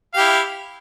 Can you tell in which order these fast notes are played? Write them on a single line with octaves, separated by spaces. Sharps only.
F5 G4 E4